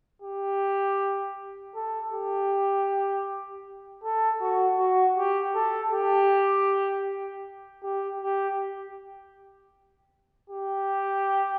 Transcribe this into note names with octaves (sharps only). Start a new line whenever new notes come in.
G4
A4
G4
A4
F#4
F#4
G4
A4
G4
G4
G4
G4